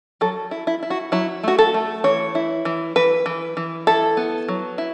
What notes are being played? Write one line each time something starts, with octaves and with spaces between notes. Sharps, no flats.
F#3 A4
E4
E4
E4
F#4
F#3 E4
A3 F#4
A4
A3
E3 C#5
E4
E3
E3 B4
E3
E3
E4 A4
B3
F#3
E4